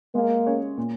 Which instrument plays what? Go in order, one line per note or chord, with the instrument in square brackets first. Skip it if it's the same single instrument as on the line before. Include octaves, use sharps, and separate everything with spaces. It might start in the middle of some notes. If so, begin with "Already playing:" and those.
[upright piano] G#3 [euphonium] A#3
[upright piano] C#4 G#4 C#5
A#2